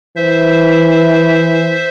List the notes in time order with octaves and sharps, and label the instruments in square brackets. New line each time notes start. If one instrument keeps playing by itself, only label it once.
[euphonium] E3 [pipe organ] C5 E5